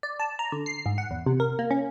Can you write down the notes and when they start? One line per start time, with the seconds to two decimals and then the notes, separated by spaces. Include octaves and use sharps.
0.03 D5
0.20 A5
0.39 A#5
0.52 D3
0.66 C7
0.86 G#2
0.98 F#5
1.11 E2
1.26 C3
1.40 A#4
1.59 A#3
1.71 C#4